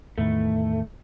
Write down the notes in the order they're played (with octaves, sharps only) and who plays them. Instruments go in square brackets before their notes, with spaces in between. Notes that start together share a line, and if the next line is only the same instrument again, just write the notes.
[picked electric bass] E2 A2 D#3 [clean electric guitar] A3